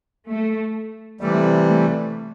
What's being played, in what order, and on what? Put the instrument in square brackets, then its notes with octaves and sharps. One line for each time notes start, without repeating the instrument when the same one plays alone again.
[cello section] A3
[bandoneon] C3 E3 G3 [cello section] A3
[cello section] A3